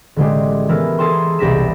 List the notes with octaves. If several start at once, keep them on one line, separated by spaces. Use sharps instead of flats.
A1 D3 G#3 G4
E3 B3 A4 A#4
G#4 A4 A5 A#5 C6
E1 C2 G4 A#6 B6 E7